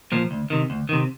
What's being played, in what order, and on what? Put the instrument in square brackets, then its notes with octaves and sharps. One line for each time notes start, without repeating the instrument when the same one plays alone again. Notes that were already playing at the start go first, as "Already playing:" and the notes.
[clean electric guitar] A#2 F3
D2
C3 D#3
D2
C3 D#3